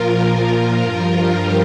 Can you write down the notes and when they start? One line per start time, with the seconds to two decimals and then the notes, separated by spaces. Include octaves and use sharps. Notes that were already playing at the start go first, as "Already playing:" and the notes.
Already playing: A#2 F3 F4 A#4
0.29 F4 A#4
0.79 G2 F3
1.29 G4